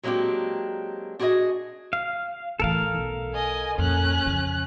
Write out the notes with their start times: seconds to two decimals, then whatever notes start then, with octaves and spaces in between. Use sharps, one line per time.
0.03 F#3 G#3 A#3 C4 D4 G4
1.19 D4 F#4 G#4 B4 D#5 G#5
1.93 F5
2.60 A2 E3 A4 A#4 F5
2.95 B1
3.34 D#5 G#5
3.78 F2 A#2 C#4 F#6
4.26 F2 C#3